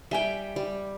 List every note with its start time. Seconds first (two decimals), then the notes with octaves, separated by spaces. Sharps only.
0.11 G3 E5 G5 G#5
0.56 G3